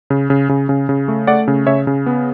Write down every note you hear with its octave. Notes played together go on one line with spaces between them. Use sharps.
C#3
C#3
C#3
C#3
C#3
A3
A3 D5 F#5
C#3
C#3 C#5 E5
C#3
B3